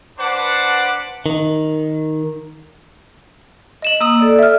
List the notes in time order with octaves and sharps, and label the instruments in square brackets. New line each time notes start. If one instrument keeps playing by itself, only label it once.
[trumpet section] D4 B4 C5 F#5 A5 D6
[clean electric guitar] D#3
[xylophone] D#5 E7 F#7
[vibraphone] A#3 [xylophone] D#6 E6
[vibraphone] A4 D5
[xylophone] E5 F6